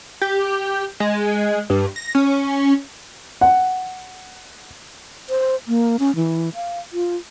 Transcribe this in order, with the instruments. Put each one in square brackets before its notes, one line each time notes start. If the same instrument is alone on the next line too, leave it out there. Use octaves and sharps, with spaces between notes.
[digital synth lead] G4
G#3
G2
A#6
C#4
[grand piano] F#5
[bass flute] C5
A#3
C#4
E3
F5
F4